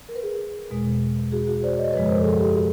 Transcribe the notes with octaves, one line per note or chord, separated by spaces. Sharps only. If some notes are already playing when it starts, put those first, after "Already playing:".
A#4
B4
G#4 A#4
E2 B2 G#3
F#4 G#4
F#4 G#4
C5 D5
C#5 D#5
F#2 C#3 F3 G#3 B4 C#5
A#4 C5
A4
G#4 A#4
G4 A4
F#4 G#4